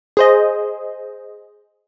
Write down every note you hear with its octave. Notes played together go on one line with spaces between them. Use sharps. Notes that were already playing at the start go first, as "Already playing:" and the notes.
G#4 C5 D#5